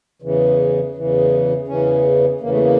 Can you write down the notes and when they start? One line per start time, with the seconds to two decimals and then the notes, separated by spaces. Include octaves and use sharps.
0.22 E2 C#3 E3
0.95 E2 C#3 E3
1.67 E2 C#3 E3 C#4
2.40 E2 C#3 E3 A#3
2.50 A3
2.60 A#3